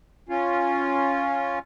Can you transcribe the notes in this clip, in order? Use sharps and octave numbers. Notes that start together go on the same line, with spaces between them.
C#4 F4